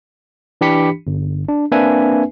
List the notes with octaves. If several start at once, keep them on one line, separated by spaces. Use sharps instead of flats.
E3 D4 G4 B5 B6 C#7
G1
D4
A#3 C4 D4 B4 E5 G#5